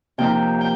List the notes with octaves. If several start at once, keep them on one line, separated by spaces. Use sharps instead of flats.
C3 F3 A#3 D#4 G5
G5